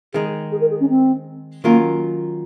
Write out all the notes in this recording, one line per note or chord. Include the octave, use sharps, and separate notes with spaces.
D#3 G#3 D#4 G#4
G#4
A#4
G#4
C#4
C4
D#3 F#3 A#3 C#4 F4 A#4